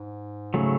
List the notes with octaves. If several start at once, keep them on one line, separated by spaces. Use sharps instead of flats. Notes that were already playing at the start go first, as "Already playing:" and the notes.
Already playing: G#2
C#3 F#3 A3